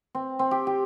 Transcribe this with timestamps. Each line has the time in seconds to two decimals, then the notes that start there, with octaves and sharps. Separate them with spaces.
0.15 C4
0.39 C4
0.51 G4
0.67 G4